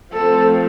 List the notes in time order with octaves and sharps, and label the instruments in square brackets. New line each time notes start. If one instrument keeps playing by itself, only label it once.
[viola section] F3 A3 C4 [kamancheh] A4